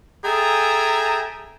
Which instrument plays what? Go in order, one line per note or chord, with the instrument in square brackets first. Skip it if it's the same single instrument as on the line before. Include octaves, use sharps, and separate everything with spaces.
[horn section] G#4 A4 E5 G5 G#5 A#5